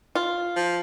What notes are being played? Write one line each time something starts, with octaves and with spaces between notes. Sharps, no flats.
F4
F3